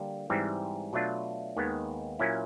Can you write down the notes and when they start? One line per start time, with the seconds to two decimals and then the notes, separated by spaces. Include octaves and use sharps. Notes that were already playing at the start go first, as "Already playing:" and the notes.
Already playing: D3 G3 A#3
0.30 G#2 E3 G3 C4
0.93 B2 F#3 A3 D4 F4
1.56 D#2 D#3 G#3 B3
2.19 A#2 F#3 A#3 C#4 E4